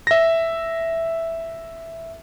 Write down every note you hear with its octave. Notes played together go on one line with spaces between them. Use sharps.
E5 A#6